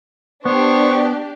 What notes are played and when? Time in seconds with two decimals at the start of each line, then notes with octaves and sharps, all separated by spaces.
0.45 B3 D4 G4 C5 C#6